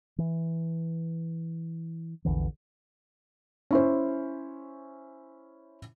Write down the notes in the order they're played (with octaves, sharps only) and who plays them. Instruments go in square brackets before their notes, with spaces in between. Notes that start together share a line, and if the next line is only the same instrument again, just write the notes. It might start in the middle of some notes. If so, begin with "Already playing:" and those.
[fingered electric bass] E3
A#1 E2 D3 E3
[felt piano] C#4 E4 C5